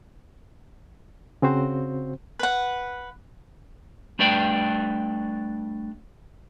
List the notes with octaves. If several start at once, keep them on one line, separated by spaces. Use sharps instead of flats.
C#3 C4 F#4 C5
B4 F#5
G3 A3 D4 B4 D5 G5